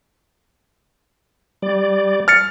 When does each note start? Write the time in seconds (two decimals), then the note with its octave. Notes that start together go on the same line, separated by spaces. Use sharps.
1.62 G3 D5
2.28 F6 A6 C#7